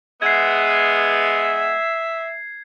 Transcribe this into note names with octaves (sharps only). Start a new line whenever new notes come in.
G#3 B3 E5 G#6 C7